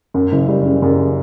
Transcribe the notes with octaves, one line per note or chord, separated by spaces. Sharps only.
F#2
F#1
G3
C#3
F#2